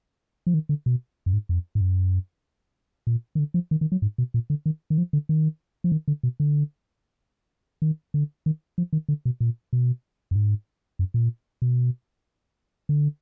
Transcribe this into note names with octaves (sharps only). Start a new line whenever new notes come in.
F3
D#3
D3
B2
F#2
G#2
F2
G#2
F#2
A#2
D#3
D3
F3
D#3
D#3
F#3
G#2
B2
A#2
D3
D#3
D#3
F3
D3
D#3
F3
D#3
D3
B2
D3
D#3
D3
D#3
F3
D#3
D3
B2
A#2
B2
F#2
G#2
F#2
A#2
B2
D3